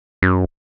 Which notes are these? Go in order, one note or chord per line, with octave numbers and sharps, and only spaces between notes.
F#2